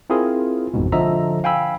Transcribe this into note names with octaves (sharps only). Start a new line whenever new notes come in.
C4 E4 F4 G#4 A#4
A1 F2 G#2 B2
D3 F3 A4 D#5 E5 A#5
F5 G5 G#5 B5 E6